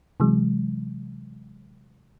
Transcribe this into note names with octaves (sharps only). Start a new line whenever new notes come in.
C3 E3 F#3 G#3